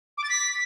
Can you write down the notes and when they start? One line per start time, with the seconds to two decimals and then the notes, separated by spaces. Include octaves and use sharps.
0.17 D6
0.23 A6
0.29 B6